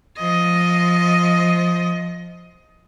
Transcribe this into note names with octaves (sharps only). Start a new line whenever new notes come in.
F3 D#5